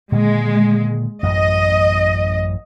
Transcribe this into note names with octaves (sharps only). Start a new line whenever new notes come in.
A#2 D3 D#3 G#3
A1 F#2 D#5